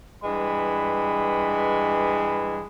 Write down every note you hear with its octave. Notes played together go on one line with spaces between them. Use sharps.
G2 E3 G#3 B5